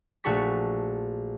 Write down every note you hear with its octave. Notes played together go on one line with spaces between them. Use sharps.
A#1 A3 F#4 A4 C#6 B6